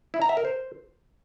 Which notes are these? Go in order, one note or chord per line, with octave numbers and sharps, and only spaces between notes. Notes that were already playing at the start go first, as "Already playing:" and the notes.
E4
A#5
E5
A#4
C5